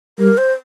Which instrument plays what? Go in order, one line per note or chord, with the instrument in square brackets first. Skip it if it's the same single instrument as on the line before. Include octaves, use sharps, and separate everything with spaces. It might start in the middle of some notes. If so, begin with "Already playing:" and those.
[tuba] G3 [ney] A#4
[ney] C5